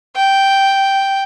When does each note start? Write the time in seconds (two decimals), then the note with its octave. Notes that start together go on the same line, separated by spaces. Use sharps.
0.16 G5